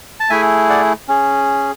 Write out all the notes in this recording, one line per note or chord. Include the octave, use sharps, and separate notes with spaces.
A5
A3 E4 G#4 E5 G#5
D5 F#5
C#4 G#4